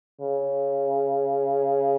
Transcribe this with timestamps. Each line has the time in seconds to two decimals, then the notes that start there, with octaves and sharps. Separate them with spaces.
0.21 C#3